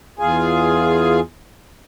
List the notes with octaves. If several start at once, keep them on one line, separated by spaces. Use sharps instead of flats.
E2 F4 G#4 G#5